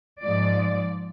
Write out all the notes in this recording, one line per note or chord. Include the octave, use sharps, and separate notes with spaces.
G#2 F3 D5